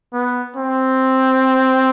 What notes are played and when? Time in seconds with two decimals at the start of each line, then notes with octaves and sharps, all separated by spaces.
0.14 B3
0.57 C4